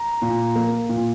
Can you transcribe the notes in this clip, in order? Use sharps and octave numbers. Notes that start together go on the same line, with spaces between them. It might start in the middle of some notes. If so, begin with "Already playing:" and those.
Already playing: A#5
A#2
A#3
A#2